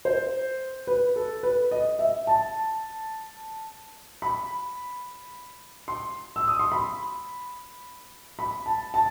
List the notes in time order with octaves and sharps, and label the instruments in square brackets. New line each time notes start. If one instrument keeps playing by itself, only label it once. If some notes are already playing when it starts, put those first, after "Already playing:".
[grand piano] C5
B4
A4
B4
D#5
E5
A5
B5
C6
E6
D#6
C6
B5
B5
A5
A5